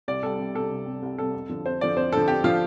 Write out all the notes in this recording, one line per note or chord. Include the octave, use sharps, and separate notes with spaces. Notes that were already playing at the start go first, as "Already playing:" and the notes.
C2 D5
C3 G3 A4
C2
C3 G3 A4
C2
C3 G3
C2
C3 G3 A4
F2
D3 F3
F2 C5
D3 F3 D5
F2 C5
D3 F3 A4
F2 G4
D3 F3 F4